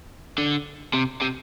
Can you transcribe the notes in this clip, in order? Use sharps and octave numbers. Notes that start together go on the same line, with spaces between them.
D3
C3
C3